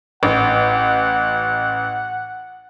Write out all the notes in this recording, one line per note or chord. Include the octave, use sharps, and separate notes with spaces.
A1 F#5